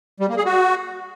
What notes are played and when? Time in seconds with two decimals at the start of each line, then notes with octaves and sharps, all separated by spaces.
0.20 G3
0.29 A#3
0.37 G#4
0.45 F#4